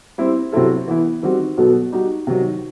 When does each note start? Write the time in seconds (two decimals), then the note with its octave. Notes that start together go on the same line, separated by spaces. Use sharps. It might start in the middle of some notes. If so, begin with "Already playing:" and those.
0.18 G3 C4 E4
0.52 C3 F#3 C4 E4 A4
0.88 E3 B3 E4
1.22 D#3 G3 C4 F#4
1.57 B2 F#3 B3 F#4 A4
1.92 G3 D#4 F#4
2.27 C3 D#3 F#3